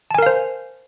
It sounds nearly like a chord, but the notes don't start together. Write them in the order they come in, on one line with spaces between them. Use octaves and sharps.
A5 G#5 A#4 F5 C5